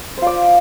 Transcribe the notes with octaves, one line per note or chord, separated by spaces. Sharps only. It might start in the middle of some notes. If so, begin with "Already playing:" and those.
F4 C5 D5